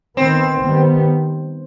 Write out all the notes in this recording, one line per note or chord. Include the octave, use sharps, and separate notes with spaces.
D#3 B3 C4
D#3 G3 B3